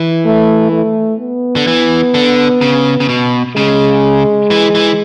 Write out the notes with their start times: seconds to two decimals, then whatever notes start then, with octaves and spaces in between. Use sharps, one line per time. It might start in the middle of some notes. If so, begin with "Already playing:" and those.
Already playing: E3
0.25 A3
0.72 A3
1.20 B3
1.56 D3
1.67 E3
2.14 D3
2.61 C#3
3.00 C#3
3.09 B2
3.56 C#3 G#3
4.51 E3
4.75 E3